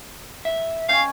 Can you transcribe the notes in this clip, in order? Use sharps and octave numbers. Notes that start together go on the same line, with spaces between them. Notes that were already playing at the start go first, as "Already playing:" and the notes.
E5
C#4 F5 G5 G#5